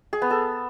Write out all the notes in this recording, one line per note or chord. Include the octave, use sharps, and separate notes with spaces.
G#4
B3
A4